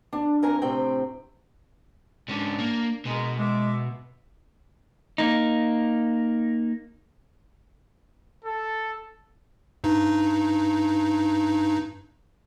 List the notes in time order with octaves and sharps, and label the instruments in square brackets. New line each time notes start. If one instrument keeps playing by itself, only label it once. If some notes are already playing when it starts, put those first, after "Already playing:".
[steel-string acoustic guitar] D4
F2 A#4 G#5 A#5
A2 C3 C4 G5
[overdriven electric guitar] G#2 C#4 [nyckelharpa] D4
[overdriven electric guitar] A#3
[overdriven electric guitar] B2 [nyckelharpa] G#3 A#4
[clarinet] G#3 [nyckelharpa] E5 D6
[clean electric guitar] A#3 D#4
[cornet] A4
[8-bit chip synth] G2 D#4